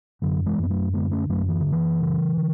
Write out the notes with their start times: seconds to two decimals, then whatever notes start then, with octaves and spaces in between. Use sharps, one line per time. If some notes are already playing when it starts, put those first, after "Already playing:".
0.22 F#2 D3 F#3
0.46 E3 G#3
0.58 F#2 B3
0.70 F#3 A3
0.93 D3 G#3 B3
1.11 A3 C#4
1.29 F#2 F#3 A3
1.48 E3
1.60 D3
1.66 F#2
1.72 E3
2.01 C#3
2.37 D3